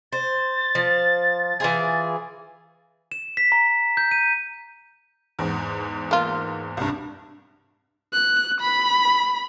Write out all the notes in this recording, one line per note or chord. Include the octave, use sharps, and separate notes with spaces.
C5 A6
F3
E3 F4 G#4
E7
B6
A#5
G6
D#7
E2 G#2
A#3 F4
C2 G2
F#6
B5